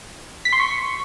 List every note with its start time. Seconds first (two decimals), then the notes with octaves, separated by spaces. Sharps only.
0.45 B6
0.53 C6
0.60 C#6